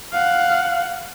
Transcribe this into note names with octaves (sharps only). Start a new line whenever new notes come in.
F5 F#5